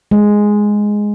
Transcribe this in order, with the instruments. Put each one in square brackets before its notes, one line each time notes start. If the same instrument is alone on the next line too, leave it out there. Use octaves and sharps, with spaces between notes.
[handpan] G#3